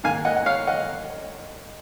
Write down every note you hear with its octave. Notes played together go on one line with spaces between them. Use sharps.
G#2 D#3 A#3 F5 G#5
D#5 F#5
F#5
C#5 F5
D#5 F#5